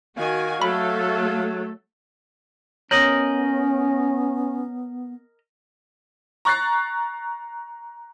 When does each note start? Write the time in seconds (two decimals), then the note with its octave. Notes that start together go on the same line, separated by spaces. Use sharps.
0.17 D#3 F#4 F5 G#5
0.62 F#3 A3 A4 B5
2.91 B3 C#4 A#4 C#5 D#5 G6 F#7
6.45 A#5 C#6 F#6 A6 C7